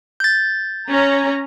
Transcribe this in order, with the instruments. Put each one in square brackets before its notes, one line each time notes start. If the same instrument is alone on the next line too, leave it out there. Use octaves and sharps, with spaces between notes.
[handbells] G6 A6
[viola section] C#4 A#5